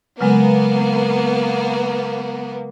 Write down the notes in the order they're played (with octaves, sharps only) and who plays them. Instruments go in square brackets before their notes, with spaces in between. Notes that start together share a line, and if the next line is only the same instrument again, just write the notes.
[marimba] C#3 F#3 G#3 [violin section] A#3 B3